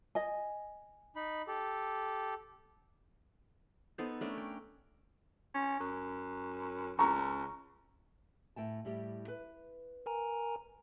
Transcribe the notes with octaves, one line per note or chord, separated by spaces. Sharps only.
D#5 G#5
D#4 B5
G4 A4
B3 D#4 A4 C5
A3 C#4 D4 A#4
G5
C#4
F#2
C#2 A#5 C#6
A2 G5 A5
A2 G3 G4
B4
A#4 G#5 A#5